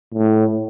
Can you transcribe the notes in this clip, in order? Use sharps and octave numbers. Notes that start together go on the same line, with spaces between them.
A2